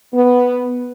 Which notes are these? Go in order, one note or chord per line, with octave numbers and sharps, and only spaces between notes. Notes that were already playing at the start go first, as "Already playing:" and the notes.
B3